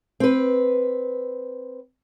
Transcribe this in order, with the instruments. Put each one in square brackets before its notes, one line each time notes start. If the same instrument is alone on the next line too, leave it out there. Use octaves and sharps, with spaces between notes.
[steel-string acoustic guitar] C4 B4